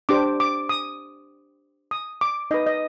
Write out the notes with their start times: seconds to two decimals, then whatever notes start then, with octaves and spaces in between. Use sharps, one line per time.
0.09 D4 G4 C5 D6
0.40 D6
0.69 D#6
1.91 D#6
2.21 D6
2.51 D#4 D#5
2.54 B4
2.66 D#5